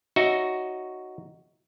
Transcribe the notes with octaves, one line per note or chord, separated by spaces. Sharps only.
D#4 F#4 C#5 E5